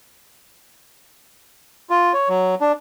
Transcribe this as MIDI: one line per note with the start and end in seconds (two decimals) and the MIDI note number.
1.90 2.13 65
2.13 2.29 73
2.29 2.55 54
2.61 2.72 62